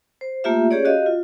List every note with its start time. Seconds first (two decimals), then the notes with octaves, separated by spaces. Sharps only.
0.21 C5
0.44 A3 A#3 F4 G4 E5
0.71 C#4 G4 G#4 C#5 D5
0.85 F#4 G4 D#5 F5
1.06 F4